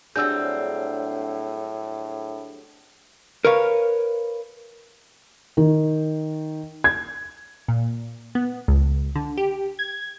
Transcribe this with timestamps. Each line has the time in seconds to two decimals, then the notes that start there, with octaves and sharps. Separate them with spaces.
0.16 A2 F#3 G3 C4 D4 G#4 E6 G6
3.45 A#4 B4 C#5 F5
5.57 D#3
6.84 G#6
7.68 A#2
8.35 B3
8.68 C#2
9.15 D3
9.37 G4
9.79 G#6